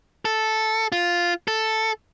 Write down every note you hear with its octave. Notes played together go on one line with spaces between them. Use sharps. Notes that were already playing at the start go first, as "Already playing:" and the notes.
A4
F4
A4